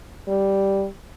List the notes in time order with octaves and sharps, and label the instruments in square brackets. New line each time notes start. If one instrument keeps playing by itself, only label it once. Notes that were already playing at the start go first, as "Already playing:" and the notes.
[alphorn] G3